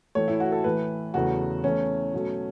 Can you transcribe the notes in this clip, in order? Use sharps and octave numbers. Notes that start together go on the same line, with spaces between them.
A2 E3 A3 C#5
E4
F#4
A4
A2 E3 A3 B4
E2 C#3 A3 F#4
E2 E3 A3 C#4
B2 F#3 A3